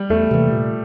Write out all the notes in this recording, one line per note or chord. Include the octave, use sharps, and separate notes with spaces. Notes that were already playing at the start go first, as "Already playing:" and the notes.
Already playing: G3
E2 A3
C3 E3 A#3
A#2